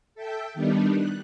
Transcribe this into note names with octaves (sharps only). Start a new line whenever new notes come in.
A4 E5 G5
D#3 G3 B3 D4 D#4
F#6